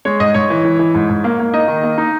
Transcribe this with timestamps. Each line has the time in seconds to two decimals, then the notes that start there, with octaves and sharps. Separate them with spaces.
0.05 G#3 C#5
0.20 G#2 D#5
0.34 G#2 C#5
0.50 E3
0.65 E3
0.79 E3
0.95 G#2
1.10 G#2
1.24 A#3
1.39 A#3
1.54 D#4 D#5
1.68 D#3
1.83 A#3
1.98 D#4